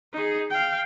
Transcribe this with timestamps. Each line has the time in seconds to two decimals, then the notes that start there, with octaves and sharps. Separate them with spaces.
0.13 D#4 G#4
0.50 F5 G5